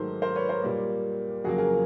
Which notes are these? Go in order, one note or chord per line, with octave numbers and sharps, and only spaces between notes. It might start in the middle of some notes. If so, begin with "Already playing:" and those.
Already playing: G#2 D#3 F#3 A3 A#4 C5
A#4 C5
B4 C#5
A#4 C5
A#2 G3 A#3
F2 C#3 F#3 A#3 F#4 G#4
G#4 A#4